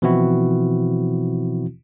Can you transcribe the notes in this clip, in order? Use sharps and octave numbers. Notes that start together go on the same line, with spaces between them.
B2 E3 F3 C4 E4 F#4